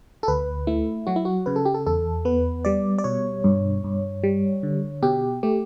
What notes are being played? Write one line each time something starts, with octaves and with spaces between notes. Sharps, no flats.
A4
D2 B4
A3 E4
F#3 F#4
E4
F#4
C#3 B4
A4
G4
A4
E2 A4
B3 B4
G3 D5
D5
B2 C#5
G2
G2
G3
D3
B2 G4
A3 G4